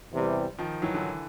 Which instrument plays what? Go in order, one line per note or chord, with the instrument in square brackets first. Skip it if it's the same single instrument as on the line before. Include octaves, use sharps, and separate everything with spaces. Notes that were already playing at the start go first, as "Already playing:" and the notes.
[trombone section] E2 C3 E3 G3
[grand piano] D#3 F3
E3 F#3
D3 E3